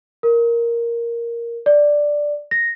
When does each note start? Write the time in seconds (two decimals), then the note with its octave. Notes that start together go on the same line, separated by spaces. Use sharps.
0.23 A#4
1.66 D5
2.51 A#6